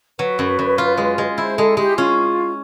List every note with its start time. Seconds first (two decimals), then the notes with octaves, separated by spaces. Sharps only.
0.19 F#3 B4
0.39 F#2
0.59 F#2
0.78 F4
0.97 G#3
1.18 G#3
1.38 E4 C5
1.58 G#3 A4
1.77 G#3 G4
1.97 C#4 F4